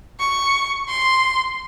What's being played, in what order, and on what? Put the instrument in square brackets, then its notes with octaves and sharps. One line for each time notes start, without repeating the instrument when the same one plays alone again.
[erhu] C#6
C6